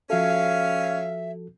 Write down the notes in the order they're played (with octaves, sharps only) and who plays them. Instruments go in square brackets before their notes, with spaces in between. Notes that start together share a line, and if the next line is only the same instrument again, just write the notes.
[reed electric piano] F3 F#4 A4 [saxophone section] C#4 F5 [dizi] E5